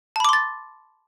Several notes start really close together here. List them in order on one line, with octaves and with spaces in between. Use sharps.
A5 B5 D6 C6 A6